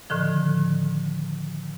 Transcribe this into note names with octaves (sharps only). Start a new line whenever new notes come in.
A2 D3 D#3 F3